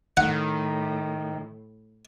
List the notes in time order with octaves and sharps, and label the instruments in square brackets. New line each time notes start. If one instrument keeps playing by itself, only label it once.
[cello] A2 [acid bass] D#3 [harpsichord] F#5